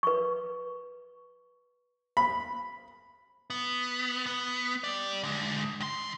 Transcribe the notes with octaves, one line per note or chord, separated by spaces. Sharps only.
B4 C#6
B5
B3
B3
G4 D5
D3 G#3
D#3 C6